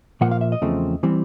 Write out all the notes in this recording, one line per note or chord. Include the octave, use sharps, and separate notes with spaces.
A#2 F3 A#3 F#5
F5
E5
D#5
E2 C#3 F3 A3 C4
E3 G3 C4